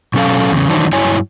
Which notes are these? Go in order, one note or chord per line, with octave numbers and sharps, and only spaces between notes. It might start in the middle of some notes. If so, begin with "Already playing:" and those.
B2 F#3 C#4 A4 F5
E2 C#3
D#3 E3 F#3 D4 D#4 C5
G2 F#3 E4 C#5 G#5